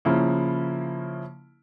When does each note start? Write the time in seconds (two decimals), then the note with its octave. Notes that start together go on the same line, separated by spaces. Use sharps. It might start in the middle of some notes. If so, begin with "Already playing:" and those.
0.05 C#3 F3 A#3 C#4 E4